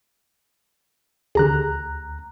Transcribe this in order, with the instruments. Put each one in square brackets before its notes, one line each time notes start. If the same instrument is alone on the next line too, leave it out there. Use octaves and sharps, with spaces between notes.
[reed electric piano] D2 A#5 F#6 [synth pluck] D3 G4 G#4